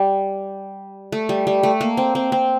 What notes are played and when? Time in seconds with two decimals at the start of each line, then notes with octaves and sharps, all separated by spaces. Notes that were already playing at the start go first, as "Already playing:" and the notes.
Already playing: G3
1.12 A3
1.29 G3
1.47 G3
1.63 A3
1.81 A#3
1.97 C4
2.15 C4
2.32 C4